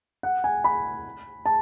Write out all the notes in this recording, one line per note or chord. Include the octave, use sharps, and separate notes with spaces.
F#5
G#5
B5
A5